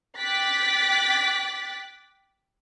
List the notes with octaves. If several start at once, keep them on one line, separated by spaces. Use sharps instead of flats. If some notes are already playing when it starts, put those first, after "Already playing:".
G5 D6 F#6 A6 B6